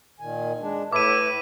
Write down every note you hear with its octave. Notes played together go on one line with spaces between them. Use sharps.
A#2 D#3 G#5
G#3 D4
A2 E4 B4 D6 D#7